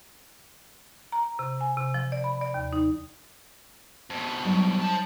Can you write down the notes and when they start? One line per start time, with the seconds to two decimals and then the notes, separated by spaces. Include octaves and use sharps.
1.12 A#5
1.39 C3
1.61 G#5
1.77 C3
1.94 F3
2.12 D5
2.24 B5
2.41 D5
2.54 D#2
2.73 D#4
4.10 F2 B2
4.45 F#3 G3 D#4
4.82 C5 A5